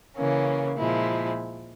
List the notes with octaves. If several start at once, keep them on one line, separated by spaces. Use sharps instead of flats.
C#3 E3 A#3 C#4
A#2 F3 G#3 E4